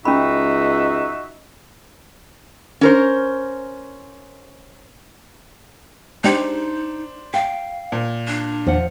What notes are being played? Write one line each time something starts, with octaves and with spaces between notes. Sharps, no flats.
C#2 C#4 D#4 F#4 E5 B5
C#4 A#4 C5
G#3 D4 D#4 G4 C5
F5 G5
A#2
D4
E2 F3 F#5